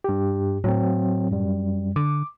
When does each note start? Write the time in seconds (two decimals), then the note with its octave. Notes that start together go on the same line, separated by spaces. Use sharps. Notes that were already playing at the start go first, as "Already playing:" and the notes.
0.04 G2 G4
0.64 A2 F#3 C4
1.31 F#2 G3
1.96 D3 D6